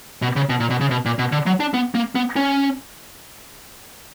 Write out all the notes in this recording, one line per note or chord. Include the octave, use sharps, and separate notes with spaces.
B2
C#3
B2
A#2
B2
C#3
B2
A#2
B2
D3
F#3
D4
B3
A#3
B3
C#4